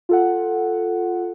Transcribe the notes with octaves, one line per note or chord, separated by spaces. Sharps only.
F4 A4 F#5